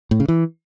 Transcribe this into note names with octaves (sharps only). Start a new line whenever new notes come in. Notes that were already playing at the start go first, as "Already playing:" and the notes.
A2
C#3
E3